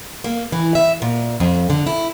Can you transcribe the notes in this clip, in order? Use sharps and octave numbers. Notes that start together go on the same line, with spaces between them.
A#3
E3
E5
A#2
F2
D3
E4